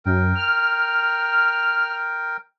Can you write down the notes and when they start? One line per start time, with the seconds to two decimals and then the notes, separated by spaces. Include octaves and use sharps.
0.06 F#2 A#4 G5
0.35 F6